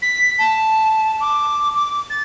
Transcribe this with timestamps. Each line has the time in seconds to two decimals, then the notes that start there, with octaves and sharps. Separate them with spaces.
0.02 B6
0.39 A5
1.20 D6
1.76 D6
2.10 A6